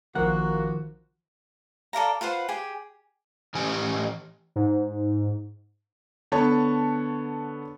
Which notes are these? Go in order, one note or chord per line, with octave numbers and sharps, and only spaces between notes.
A#1 D#3 F3 A#3 F#4 A#4 F#5 F#6
A4 D5 F5 A#5
F4 B4 C5 F#5
G4 G#4
A2 E3 C#4 G4 G#5
G#2
D3 B3 C#5 A5 C#6